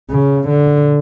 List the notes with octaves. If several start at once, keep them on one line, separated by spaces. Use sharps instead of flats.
C#3
D3